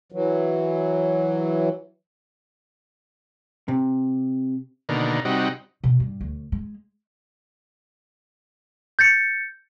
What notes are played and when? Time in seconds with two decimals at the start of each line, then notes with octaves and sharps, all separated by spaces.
0.12 E3 F#3
3.68 C3
4.89 B2 D3 D#3 A#3
5.25 C3 G3 D#4 F#4
5.84 B2
6.00 G2
6.21 D2
6.52 G#3
8.99 G6 A6 C#7